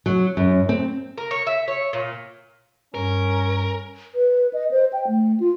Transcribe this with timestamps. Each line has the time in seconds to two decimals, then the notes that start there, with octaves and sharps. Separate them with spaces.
0.06 F#3
0.37 F#2
0.69 C4
1.18 A#4
1.31 C#5
1.47 E5
1.68 C#5
1.93 A#2
2.95 G2 C#4 A#4
4.15 B4
4.53 D#5
4.71 C5
4.93 G5
5.08 A3
5.40 F4